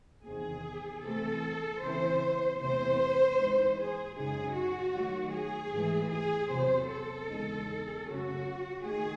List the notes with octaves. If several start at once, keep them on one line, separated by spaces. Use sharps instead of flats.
E2 C3 D#3 G#4
C3 E3 A3 C4 A4
C#3 E3 C4 E4 C5
E2 C3 E3 A3 C4 C5
G#2 E3 G#3 D#4
G#4
F#2 C#3 G#3 D#4 G#4
F#4
D#3 F#3 A3
G#4
G#2 E3 A3
G#4
E2 C3 F#3 C5
A4
E2 C#3 G#3 D#4
F#2 C#3 F#3 A3 C#4 F#4
D#3 A3 G#4